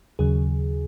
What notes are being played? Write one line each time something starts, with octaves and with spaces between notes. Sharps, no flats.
D#2 C#3 F#3 G#4